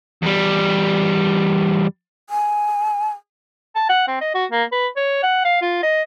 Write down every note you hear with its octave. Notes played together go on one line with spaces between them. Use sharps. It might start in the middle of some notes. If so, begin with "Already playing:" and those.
E2 G3
G#5
A5
F#5
C4
D#5
F#4
A#3
B4
C#5
F#5
F5
F4
D#5